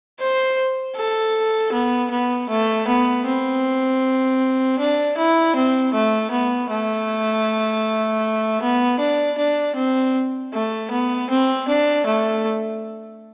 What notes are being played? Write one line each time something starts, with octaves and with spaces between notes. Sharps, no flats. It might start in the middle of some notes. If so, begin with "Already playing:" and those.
C5
A4
B3
B3
A3
B3
C4
D4
E4
C4
A3
B3
A3
B3
D4
D4
C4
A3
B3
C4
D4
A3